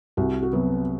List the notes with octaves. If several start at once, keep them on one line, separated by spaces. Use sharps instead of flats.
C2 F#4
F#4
C3 F#3 B3